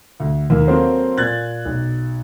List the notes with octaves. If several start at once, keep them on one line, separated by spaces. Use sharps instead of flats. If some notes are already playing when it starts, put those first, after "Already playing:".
D2
D#2 A#3
F#3 A#3 C4 A4 C5
A#2 F#6 G#6 A6
B1